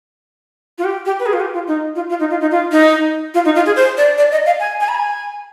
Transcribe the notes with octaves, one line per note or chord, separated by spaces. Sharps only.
F4
G4
G4
B4
G#4
F4
G4
F4
D#4
F4
F4
D#4
F4
D#4
F4
D#4
F4
D#4
F4
G#4
C5
D5
D5
D#5
F5
G#5
G#5
B5
G#5